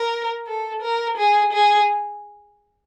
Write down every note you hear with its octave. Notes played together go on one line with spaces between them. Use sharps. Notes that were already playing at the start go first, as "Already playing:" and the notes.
Already playing: A#4
A4
A#4
G#4
G#4